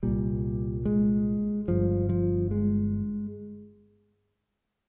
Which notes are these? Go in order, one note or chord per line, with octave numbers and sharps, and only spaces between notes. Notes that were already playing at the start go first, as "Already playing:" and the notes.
C2 A#2 G3
G#3
G1 G2 F3
F3
G#3